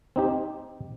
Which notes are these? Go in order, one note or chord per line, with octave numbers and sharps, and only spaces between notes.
C4 D#4 G4